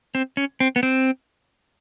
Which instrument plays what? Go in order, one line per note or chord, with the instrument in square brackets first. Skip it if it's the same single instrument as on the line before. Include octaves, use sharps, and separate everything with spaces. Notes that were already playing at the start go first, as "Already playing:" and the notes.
[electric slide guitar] C4
C#4
C4
B3
C4